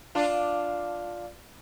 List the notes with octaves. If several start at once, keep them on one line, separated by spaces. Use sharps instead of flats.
D4 F4